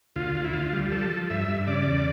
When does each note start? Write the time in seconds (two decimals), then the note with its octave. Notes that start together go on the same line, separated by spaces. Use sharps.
0.16 D2 F4
0.35 D2
0.44 E4
0.53 D2 F4
0.73 G3
0.92 F3 A4
1.11 F3
1.30 G2 E5
1.48 G2
1.67 C#3 D5
1.87 E2